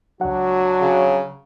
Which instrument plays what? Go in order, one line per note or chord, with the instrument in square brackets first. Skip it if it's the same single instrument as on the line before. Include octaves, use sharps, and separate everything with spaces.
[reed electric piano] C#2 F#5 [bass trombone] F#3 [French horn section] D4 F#4
[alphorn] C#3